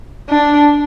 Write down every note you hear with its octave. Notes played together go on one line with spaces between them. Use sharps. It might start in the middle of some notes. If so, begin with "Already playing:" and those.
D4